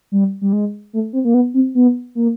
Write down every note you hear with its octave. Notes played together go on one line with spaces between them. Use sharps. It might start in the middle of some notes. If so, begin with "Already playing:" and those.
G3
G3
G#3
A3
C4
A#3
B3
C4
B3
A#3